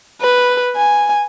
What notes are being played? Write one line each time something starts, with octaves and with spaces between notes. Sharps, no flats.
B4
G#5